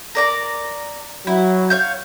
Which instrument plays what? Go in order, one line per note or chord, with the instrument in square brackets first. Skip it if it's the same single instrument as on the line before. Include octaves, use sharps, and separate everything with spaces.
[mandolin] A#4 D5 A#5
[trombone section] F#3 [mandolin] E4
[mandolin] C#5 F5 G6